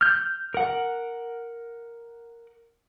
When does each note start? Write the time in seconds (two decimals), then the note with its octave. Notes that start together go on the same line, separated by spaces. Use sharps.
0.01 F6 G6
0.54 A#4 F#5